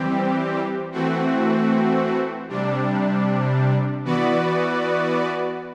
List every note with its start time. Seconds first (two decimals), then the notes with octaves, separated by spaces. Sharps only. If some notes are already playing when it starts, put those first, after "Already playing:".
Already playing: E3 G3 C4 G4
0.92 E3 A3 C4 F#4
2.49 C3 G3 D4
4.04 E3 B3 F#4 B4 D5